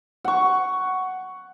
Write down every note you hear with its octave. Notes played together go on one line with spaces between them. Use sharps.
F#5 C#6